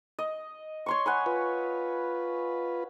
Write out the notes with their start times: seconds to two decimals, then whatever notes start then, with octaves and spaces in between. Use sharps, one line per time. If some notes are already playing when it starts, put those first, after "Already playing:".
0.19 D#5
0.86 C#5 C6 C#6
1.06 F#5 G#5 B5
1.26 F4 B4